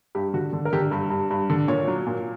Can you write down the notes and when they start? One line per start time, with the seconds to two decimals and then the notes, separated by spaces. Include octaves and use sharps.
0.15 G2 G4
0.34 D3 F#4
0.53 D3
0.65 A#4
0.73 D3 G4
0.91 G2
1.10 G2
1.31 G2
1.50 D3
1.68 A#2 C#5
1.87 F#3
2.07 A#2